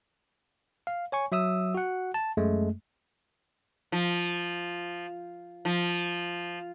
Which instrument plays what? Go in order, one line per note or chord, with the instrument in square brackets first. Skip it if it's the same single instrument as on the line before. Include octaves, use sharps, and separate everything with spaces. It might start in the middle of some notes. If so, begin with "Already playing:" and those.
[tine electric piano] F5
C#5 G#5 C#6
F#3 E5 D#6 E6
F#4 F#5
A5
F#2 G#3 A3
[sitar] F3
F3